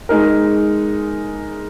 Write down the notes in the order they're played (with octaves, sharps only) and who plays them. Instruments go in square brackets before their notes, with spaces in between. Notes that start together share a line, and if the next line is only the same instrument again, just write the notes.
[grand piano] G#3 D#4 A#4